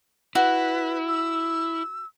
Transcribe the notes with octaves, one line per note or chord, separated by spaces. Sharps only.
E4 F#4 B4
E6